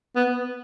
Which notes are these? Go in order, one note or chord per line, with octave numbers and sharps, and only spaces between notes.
B3